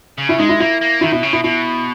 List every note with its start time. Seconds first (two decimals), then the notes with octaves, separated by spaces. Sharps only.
0.18 C#3
0.29 E4
0.39 G#3 D#4
0.49 E4
0.60 A#3 E4
0.81 A#3
1.01 D#3 E4
1.12 B2 E4
1.23 C#3
1.33 B2 E4
1.44 B2 E4